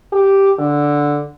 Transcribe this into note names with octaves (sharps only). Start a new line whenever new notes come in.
G4
D3